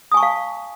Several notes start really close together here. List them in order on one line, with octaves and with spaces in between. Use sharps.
D#6 G#5 C#6 A5 F5